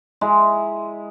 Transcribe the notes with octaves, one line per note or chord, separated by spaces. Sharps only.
G#3 E4 A#5